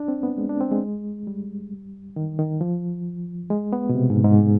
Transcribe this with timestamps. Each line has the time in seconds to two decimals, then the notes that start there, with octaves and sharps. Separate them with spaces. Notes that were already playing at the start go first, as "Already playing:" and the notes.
Already playing: D4
0.08 C4
0.23 B3
0.38 G#3
0.49 D4
0.61 C4
0.71 G#3
1.27 G3
2.16 D#3
2.39 D#3
2.61 F3
3.50 G#3
3.73 B3
3.89 B2
3.95 C3
4.10 G#2
4.24 G#2